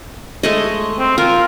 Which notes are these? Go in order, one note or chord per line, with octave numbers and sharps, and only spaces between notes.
G#3 A3 D#5
C4
F4 A#4